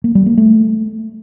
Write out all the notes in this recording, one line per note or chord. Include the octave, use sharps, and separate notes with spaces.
A#3
G3
A#3
A3